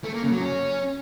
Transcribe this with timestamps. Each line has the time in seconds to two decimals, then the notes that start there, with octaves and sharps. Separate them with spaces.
0.04 A3
0.13 A#3
0.23 C#3
0.32 F#3
0.41 C#4